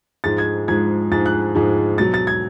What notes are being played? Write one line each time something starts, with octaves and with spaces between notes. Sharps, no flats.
G#2 F3 G#3 A6
G#6
G#2 F3 G#3 G#6
G#2 F3 G#3 A6
F#6
G#2 F3 G#3
B2 F#3 A6
A6
G#6